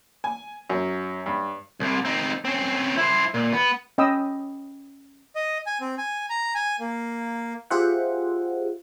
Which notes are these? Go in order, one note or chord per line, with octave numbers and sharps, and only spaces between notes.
G#5
F#2
G2
C2 C3
C4 D#4
C4 C#4
E4 C5
A#2
B3
C#4 D#5 G5 B5 D#6 E6
D#5
G#5
C4
G#5
A#5
G#5
A#3
F4 G4 G#4 C5 E5 F#5